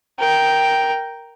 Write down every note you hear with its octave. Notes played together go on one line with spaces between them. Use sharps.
A#4 G5